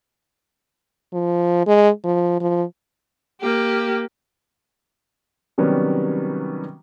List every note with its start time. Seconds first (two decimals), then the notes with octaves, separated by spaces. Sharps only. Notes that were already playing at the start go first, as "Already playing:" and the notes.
1.13 F3
1.67 G#3
2.04 F3
2.40 F3
3.41 A#3 G4
5.58 C3 D#3 F#3 G3 B3 C#4